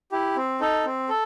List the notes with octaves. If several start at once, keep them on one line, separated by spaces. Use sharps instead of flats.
E4 G4
C4
D#4 A4
C4
A4